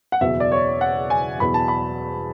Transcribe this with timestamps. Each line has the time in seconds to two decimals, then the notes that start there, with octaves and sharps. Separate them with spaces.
0.12 F#5
0.21 F#1 E2 B2 F#3 E5
0.40 D5
0.52 C#5
0.81 F#5
1.10 G#5
1.40 E2 B2 F#3 B5
1.54 A5
1.68 B5